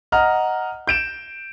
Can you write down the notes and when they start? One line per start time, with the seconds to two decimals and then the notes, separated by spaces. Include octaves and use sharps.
0.12 D#5 F#5 A#5 F6
0.87 G6 D7 E7